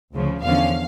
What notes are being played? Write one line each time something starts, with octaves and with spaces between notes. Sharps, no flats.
D2 C#3 F3
E2 D3 F3 C#4 F5